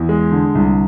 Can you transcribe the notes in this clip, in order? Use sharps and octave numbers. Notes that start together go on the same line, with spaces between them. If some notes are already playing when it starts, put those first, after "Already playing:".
Already playing: E2
G#3
D3
C2